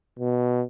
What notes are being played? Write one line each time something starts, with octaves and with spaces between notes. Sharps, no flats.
B2